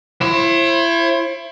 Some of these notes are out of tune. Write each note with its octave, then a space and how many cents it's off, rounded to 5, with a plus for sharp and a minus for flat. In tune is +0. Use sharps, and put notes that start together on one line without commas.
E4 +30 C5 +45